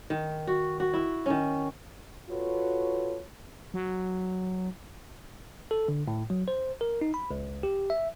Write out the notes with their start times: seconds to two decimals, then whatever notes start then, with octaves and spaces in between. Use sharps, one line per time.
0.10 D#3
0.47 F#4
0.80 F#4
0.93 E4
1.26 D#3 C#4
2.30 F4 F#4 A4 B4 C#5
3.74 F#3
5.71 A4
5.88 D3
6.08 A2
6.30 F#3
6.48 C5
6.81 A#4
7.01 D#4
7.14 B5
7.31 C#2
7.63 G4
7.90 E5